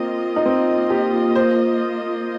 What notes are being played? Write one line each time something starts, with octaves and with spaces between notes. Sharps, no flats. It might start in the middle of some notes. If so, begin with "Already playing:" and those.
Already playing: A#3 C4 F4 D#5
D#4
C4
G4
C5